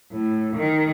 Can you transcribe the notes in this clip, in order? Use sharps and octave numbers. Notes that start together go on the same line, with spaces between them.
A2
D#3